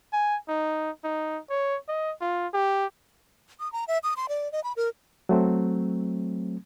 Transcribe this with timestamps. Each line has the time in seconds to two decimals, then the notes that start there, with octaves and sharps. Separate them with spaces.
0.13 G#5
0.48 D#4
1.04 D#4
1.50 C#5
1.89 D#5
2.21 F4
2.54 G4
3.60 D#6
3.72 A#5
3.88 E5
4.03 D#6
4.17 C6
4.29 D5
4.52 D#5
4.64 B5
4.77 A#4
5.29 F#3 A3 C4